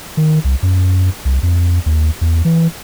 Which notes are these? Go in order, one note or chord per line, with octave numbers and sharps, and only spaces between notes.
D#3
C2
F#2
C2
F2
D#2
E2
E3